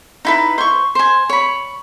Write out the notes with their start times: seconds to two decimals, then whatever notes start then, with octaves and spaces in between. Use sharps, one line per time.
0.25 D#4 E4 B4
0.58 C5 C#6
0.95 C5 G#5
1.30 C#5 B5